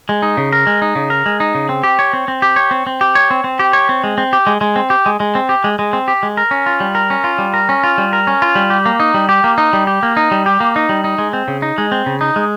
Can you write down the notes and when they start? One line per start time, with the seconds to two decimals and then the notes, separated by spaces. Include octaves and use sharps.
0.09 G#3
0.22 D#4
0.37 C#3
0.53 A#4
0.67 G#3
0.82 D#4
0.96 C#3
1.10 A#4
1.26 G#3
1.40 D#4
1.55 C#3
1.69 C4
1.84 G4
1.99 C#5
2.13 C4
2.28 C4
2.42 G4
2.56 C#5
2.71 C4
2.87 C4
3.01 G4
3.15 C#5
3.31 C4
3.44 C4
3.59 G4
3.73 C#5
3.89 C4
4.04 G#3
4.18 C4
4.33 G4
4.47 G#3
4.61 G#3
4.76 C4
4.90 G4
5.06 G#3
5.20 G#3
5.35 C4
5.49 G4
5.64 G#3
5.79 G#3
5.93 C4
6.08 G4
6.23 G#3
6.37 A#4
6.51 C#4
6.66 F4
6.80 G3
6.95 A#4
7.10 C#4
7.24 F4
7.39 G3
7.54 A#4
7.69 C#4
7.84 F4
7.98 G3
8.13 A#4
8.27 C#4
8.42 F4
8.55 G3
8.70 G4
8.86 A#3
9.00 D#4
9.14 G3
9.29 G4
9.44 A#3
9.58 D#4
9.73 G3
9.87 G4
10.03 A#3
10.17 D#4
10.31 G3
10.46 G4
10.60 A#3
10.76 D#4
10.89 G3
11.04 D#4
11.18 G#3
11.33 C4
11.48 C#3
11.62 D#4
11.78 G#3
11.92 C4
12.06 C#3
12.21 D#4
12.36 G#3